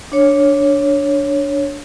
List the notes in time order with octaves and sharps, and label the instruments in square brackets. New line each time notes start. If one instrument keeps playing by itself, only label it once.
[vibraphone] D4 C#5